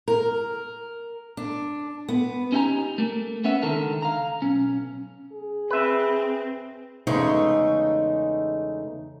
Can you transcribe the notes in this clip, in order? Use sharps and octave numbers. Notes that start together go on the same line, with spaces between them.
A#4
D4
B3
C#4 D#4 E4 G4 G#5 A#5
A3 A#3
B3 C#4 E5 F#5
C#2 D3 D#3 A4 A#4
F5 A#5
B1 C#4
G#4
C4 B4 E5
E2 C#3 G#3 A3 D#4 C#5